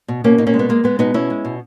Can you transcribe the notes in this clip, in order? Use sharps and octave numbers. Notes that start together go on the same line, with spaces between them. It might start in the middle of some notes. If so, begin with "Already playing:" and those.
B2
B2 A#3 C#4
B2 D#4
A#3 C#4
G#3
B3
G#3 A#3
G#3 B3
B2 B3 D#4
B2 C#4 E4
G#3
B2